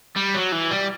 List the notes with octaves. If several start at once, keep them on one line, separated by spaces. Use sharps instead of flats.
G3
F#3
E3
G3